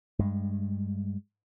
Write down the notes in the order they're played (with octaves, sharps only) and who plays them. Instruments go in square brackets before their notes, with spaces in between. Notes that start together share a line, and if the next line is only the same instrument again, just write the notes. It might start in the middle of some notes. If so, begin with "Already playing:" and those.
[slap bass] G2 G#3